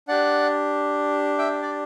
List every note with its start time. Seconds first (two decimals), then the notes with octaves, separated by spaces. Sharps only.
0.08 D4 G4 D5 F#5
1.38 E5 G5
1.62 D5